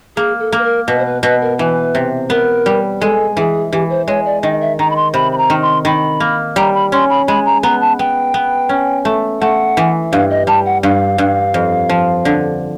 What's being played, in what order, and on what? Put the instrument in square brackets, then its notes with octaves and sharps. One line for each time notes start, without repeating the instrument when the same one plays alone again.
[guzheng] A#3 [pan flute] G#4
[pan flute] A4
[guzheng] A#3
[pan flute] B4
A#4
[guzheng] B2 [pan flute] B4
[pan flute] C5
B4
[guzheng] B2 [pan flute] B4
[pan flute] A#4
[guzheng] E3 [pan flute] B4
[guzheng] C3
[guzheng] B3 [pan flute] A#4
[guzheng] G3
[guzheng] G#3 [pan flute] A4
[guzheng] E3 [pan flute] G#4
[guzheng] E3 [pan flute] G4
[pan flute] C5
[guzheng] G#3 [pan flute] C#5
[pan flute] D5
[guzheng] D#3 [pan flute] D#5
[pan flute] E5
[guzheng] D#3 [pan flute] A#5
[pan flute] B5
C6
[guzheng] C3 [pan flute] B5
[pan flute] B5
A#5
[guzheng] D#3
[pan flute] C6
[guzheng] D#3 [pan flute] B5
[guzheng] A#3
[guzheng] G3 [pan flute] A#5
[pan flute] B5
[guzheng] C#4 [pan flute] C6
[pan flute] B5
[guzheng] G#3 [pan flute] B5
[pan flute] A#5
[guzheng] B3 [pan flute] A#5
[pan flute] A5
[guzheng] B3 [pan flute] G5
[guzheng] B3
C#4
A3
[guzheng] A3 [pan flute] F#5
[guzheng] E3
[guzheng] G2 [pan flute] F5
[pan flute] D#5
[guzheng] G3 [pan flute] A5
[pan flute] F#5
[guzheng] G2 [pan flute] F5
[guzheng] G2
F2
F3
D3